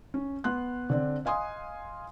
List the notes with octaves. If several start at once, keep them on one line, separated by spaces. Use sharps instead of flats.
C#4
B3 C6 F#6
D3 C4 D4
D#5 F5 G#5 C6 D#6